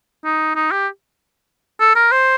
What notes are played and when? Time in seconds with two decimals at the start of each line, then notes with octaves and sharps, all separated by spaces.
0.25 D#4
0.55 D#4
0.71 G4
1.80 A4
1.95 A#4
2.12 C5